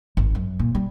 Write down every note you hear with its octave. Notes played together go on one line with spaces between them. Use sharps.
G#1
F#2
A#2
G3